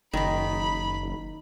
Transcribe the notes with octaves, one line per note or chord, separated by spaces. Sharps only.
F#1 D#3 D#4 B5